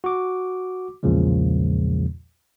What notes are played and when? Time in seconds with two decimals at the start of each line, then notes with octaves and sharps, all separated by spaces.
0.04 F#4 D6
1.03 B1 E2 A#2 C#3 F3 G#3